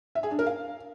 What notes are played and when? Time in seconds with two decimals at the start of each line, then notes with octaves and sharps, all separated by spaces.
0.15 E5
0.23 G#4
0.31 D4
0.39 A#4
0.46 F5